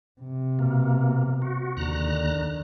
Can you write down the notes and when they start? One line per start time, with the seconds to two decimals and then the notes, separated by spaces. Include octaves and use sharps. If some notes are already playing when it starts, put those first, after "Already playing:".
0.21 C3
0.59 B2 A#3
1.42 F#4
1.77 D#2 D3 D#3 A#5 F#6